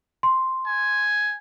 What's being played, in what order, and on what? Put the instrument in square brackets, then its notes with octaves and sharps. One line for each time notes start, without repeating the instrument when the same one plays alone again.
[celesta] C6
[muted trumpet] G#5